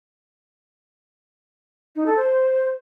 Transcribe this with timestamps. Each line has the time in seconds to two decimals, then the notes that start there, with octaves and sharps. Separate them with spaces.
1.95 D#4
2.06 A4
2.16 C5